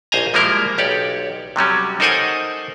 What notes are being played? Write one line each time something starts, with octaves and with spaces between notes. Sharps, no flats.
A#1 C5 D#5 G#5 A#5
F3 G3 G#3 A#3 E4 A#4
B1 G4 C#5 D5
C3 F#3 G3 C#4
D#4 A4 A#4 C5 F#5 G#5